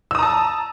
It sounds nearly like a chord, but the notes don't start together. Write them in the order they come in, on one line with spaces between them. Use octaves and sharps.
E6 D#6 A#5 A5